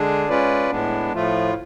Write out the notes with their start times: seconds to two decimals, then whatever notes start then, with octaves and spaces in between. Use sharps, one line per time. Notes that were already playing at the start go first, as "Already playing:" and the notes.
Already playing: D3 G#3 D4 G#4
0.29 G#3 C#4 F4 B4 D5
0.70 A2 G#3 B3 D4
1.13 A2 F3 A3 F4